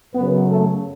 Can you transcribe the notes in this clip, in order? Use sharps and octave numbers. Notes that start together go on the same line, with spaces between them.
F#2 C#3 F#3 B3 B4
A3 A4